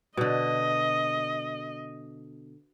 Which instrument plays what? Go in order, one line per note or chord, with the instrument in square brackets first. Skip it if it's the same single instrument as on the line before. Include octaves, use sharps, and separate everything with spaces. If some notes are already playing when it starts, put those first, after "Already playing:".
[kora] B2 D3 [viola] D#5